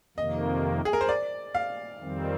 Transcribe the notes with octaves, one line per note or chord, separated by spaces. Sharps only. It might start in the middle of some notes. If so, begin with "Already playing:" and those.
F2 C3 D#3 A#3 D#5
G#4
A#4
C5
D5
F5
F2 D#3 G3 C4